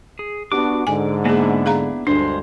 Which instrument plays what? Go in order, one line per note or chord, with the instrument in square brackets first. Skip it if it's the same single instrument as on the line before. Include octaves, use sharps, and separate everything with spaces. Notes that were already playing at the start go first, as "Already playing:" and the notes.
[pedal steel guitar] G#4
[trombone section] B3 D4 F#4 [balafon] G4 [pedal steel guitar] D6
[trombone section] G#2 D3 [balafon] G#5
[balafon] A#3 G#4 [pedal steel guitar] B3 D4 E4
[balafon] G#4 F5 A#5
[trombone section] D2 G2 [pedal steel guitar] G#3 C5 [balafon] D4